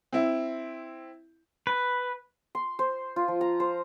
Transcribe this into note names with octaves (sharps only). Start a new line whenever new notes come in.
C4 E4
B4
C6
C5
F4
F3
A#5
C5